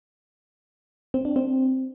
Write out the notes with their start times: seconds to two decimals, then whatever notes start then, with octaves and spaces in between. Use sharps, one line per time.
1.14 C4
1.25 D4
1.36 C4